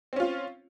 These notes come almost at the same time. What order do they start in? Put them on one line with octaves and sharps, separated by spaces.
C4 C#4 F4